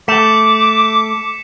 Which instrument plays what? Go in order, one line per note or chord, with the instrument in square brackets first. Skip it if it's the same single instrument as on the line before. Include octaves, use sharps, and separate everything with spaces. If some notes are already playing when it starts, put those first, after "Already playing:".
[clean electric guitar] A3 [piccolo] D6 [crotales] B6 C#7 E7